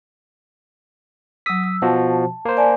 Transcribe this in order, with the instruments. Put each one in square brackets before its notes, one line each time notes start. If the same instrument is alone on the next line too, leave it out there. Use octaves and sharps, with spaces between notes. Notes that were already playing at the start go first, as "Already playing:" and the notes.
[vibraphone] F#3 E6 [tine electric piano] D#6 B6
[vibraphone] E6
[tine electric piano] B2 F3 F#4 [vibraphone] A5
[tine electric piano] A#3 C5
[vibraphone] D5 G#5 A5